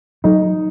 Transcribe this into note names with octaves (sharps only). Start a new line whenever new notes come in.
F#3 D#4